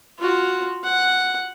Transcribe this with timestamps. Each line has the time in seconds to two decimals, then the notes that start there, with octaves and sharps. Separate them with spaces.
0.19 F4 F#4
0.84 F#5